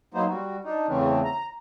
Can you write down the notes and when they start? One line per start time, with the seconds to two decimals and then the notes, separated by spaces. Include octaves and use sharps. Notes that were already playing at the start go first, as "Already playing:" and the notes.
0.14 F#3 A#3 B3 D#4 C5
0.29 G3 F#4
0.65 D4 D#4
0.88 E2 C#3 E3 A3 C4 C#4
1.24 A#5